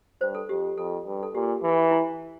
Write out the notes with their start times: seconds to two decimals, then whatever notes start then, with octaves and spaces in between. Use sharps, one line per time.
0.21 G2 C5
0.35 A4
0.49 F2 G4
0.77 F2 A4
1.06 G2
1.23 A4
1.34 A#2 G4
1.63 E3
1.91 E4